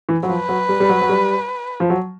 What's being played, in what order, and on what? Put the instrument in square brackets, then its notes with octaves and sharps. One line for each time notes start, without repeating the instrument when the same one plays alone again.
[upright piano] E3
F#3
[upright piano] F3 [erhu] B4
[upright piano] F#3
G3
G3
F#3
F#3
G3
F3
F#3